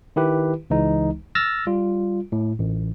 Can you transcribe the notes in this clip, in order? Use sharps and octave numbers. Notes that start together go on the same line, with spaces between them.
D#3 E4 G4 B4
C#2 E3 G#3 D#4
E6 F6 A6 A#6
G3 F4
A2
A1